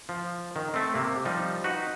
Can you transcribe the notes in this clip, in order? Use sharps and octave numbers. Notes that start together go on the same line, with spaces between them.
F3
D#3
A3 C4
C3 A#3
F3 G3 D#4
D#4 F#4 B4